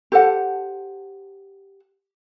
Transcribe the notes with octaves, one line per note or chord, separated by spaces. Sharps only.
G4 A4 C5 F#5